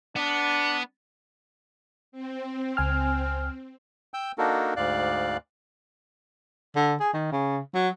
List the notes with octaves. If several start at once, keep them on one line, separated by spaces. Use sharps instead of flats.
B3 D4
C4
C#2 G#5 F6
G5 E6 G6
A#3 D4 D#4 F#4 A4 A#4
D2 G#2 D5 F5 F#6
D3
G#4
D#3
C#3
F#3